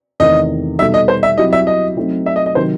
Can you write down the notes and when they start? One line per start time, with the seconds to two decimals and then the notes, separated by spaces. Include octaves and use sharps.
0.20 E2 C3 D#3 A3 D#5
0.79 B2 G3 D#4 A4 E5
0.94 D#5
1.08 C5
1.23 E5
1.38 F#3 C4 E4 G4 D#5
1.53 E5
1.67 D#5
1.96 F#3 A3 C4 D#4
2.26 E5
2.36 D#5
2.46 D#5
2.55 C3 D#3 F#3 C4 C5